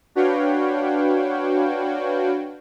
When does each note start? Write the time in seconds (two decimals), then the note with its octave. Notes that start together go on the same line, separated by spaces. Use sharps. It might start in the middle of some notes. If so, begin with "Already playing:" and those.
0.15 D4 F#4 B4 C#5 F5 G5